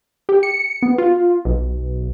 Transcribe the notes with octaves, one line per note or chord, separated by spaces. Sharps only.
G4
C#7
B3
F4
B1